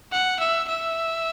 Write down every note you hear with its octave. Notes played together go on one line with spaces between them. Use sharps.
F#5
E5
E5